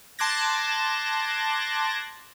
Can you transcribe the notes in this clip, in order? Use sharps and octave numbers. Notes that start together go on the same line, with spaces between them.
A5 C6 D6 F#6 G#6 A#6